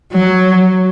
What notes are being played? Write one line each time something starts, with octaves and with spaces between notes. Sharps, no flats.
F#3